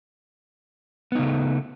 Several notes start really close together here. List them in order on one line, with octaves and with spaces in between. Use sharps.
B3 D#4 C#3 A3